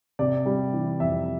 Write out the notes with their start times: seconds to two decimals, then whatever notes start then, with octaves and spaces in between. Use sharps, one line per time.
0.19 C3 D5
0.46 G3
0.73 E3
1.00 F2 E5